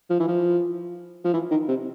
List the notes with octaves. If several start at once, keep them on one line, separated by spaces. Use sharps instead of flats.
F3
E3
F3
F3
E3
D#3
C3